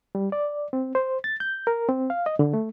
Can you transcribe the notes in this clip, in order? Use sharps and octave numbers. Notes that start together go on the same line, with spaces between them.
G3
D5
C4
C5
A6
G6
A#4
C4
F5
D#5
D3
A3